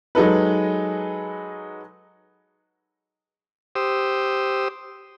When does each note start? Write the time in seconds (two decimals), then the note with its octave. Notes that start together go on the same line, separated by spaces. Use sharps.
0.15 F#3 G#3 D#4 A4 B4
3.75 G4 C5 D#6 E6